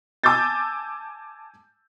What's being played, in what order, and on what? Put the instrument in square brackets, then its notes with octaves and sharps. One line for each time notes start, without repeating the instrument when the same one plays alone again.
[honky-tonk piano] G#5 A5 D6 E6 G6 A6